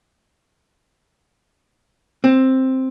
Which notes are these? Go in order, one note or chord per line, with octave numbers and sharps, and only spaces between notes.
C4